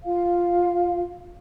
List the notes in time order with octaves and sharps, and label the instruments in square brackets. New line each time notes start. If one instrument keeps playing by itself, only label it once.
[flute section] F4 F5